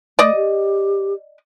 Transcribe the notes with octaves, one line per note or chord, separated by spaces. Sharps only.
A3 D5 D#5
G4